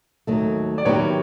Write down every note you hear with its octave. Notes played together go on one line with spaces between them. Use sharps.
D#2 D#3 F#3 A3
D5
D#3 F#3 B3 E4 G4 B4 C#5